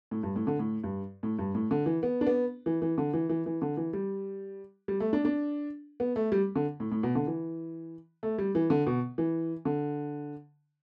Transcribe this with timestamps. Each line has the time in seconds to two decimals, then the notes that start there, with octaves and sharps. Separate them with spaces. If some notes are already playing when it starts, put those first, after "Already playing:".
0.11 A2
0.23 G2
0.36 A2
0.47 D3
0.59 A2
0.84 G2
1.23 A2
1.39 G2
1.55 A2
1.71 D3
1.86 E3
2.03 B3
2.21 D4
2.27 B3
2.66 E3
2.82 E3
2.98 D3
3.14 E3
3.29 E3
3.46 E3
3.62 D3
3.77 E3
3.93 G3
4.88 G3
5.00 A3
5.13 D4
5.25 D4
6.00 B3
6.16 A3
6.32 G3
6.56 D3
6.80 A2
6.91 A2
7.03 B2
7.15 D3
7.27 E3
8.23 A3
8.38 G3
8.55 E3
8.70 D3
8.87 B2
9.18 E3
9.65 D3